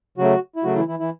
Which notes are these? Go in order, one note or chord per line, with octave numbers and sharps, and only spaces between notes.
C#3 F#3 A3 F#4
E4
C#3 F#3 A3 F#4
E3 E4
E3 E4
E3 E4